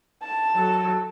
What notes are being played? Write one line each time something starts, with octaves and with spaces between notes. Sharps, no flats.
A5
F#3 A4